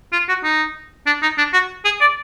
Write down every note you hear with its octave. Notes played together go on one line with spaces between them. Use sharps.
F4
F#4
D#4
D4
D#4
D4
F#4
G#4
D5